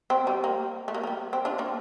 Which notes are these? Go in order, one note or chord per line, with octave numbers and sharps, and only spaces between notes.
C4
G3
A#3
A3
A#3
F3
G3
C4
D4 F4
A#3 D4